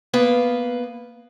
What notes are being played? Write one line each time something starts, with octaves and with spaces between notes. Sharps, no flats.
A#3 B3 B4 F5